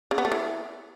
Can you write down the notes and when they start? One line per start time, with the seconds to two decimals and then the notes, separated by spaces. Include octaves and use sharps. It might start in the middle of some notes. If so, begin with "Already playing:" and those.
0.11 C#3
0.18 B3
0.25 A3
0.32 E3